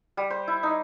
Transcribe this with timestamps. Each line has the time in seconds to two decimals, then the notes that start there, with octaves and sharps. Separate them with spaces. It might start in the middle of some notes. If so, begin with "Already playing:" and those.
0.17 G3
0.30 C5
0.48 E4
0.63 D#4